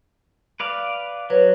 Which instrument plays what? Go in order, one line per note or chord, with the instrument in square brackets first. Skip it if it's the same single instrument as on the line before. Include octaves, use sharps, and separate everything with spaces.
[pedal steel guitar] B4 D5 F5
[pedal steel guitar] F#3 [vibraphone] B4 C#5